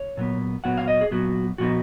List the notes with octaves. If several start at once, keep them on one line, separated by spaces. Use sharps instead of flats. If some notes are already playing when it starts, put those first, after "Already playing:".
Already playing: C#5
A#2 F#3 B3
A#2 F#3 B3 F#5
F5
D#5
G#4
A#2 F#3 B3 F#4
A#2 F3 B3 D#4 F#4